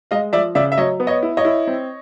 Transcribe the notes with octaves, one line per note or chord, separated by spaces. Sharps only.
G#3 D#5 F5
F3 D5 E5
C#3 D5 E5
E5
F#3 C#5 D#5
B3
C#5 D#5
E4
C#5 D#5
E4
C4